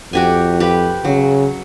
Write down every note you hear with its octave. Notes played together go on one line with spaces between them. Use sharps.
F2 F#4 G4 G#5
G4 B4
C#3 F#3